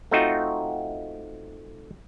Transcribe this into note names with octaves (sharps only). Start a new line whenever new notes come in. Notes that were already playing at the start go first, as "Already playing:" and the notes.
A3 C4 D#4 F4 F#4